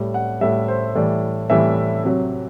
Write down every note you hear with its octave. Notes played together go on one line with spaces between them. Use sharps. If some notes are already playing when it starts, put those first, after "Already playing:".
Already playing: A2 G3
F#5
A2 G3 E5
C5
A2 E3 G3 D5
A2 E3 G3 E5
C3 F#3